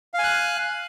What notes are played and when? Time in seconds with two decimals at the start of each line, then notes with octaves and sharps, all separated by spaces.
0.14 F5
0.19 G#5
0.24 F#6